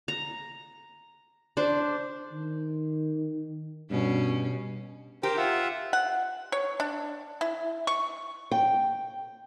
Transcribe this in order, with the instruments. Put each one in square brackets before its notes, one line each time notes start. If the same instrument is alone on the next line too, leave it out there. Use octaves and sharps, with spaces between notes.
[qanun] A#5
D4 C5
[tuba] D#3
[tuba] G2 [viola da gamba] B2 C#4
[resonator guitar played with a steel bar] G4 [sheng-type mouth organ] A#4 C5 G5
[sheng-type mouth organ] F4 E5 F#5
[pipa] F#5
C#5
D4
E4
C#6
[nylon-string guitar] G5